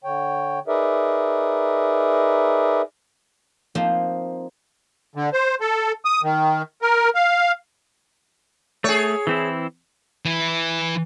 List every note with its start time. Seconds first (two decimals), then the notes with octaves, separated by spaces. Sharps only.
0.04 D3 C#5 G5
0.68 D#4 G#4 A#4 B4 D5 E5
3.75 F3 A#3 C4 D#4 C5
5.15 D3
5.33 C5
5.60 A4
6.05 D#6
6.23 D#3
6.82 A#4
7.15 F5
8.84 A3 G#4 C#5
9.27 E3 C4 E4
10.25 E3